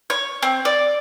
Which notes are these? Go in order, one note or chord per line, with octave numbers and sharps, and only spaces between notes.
C#5
C4
D5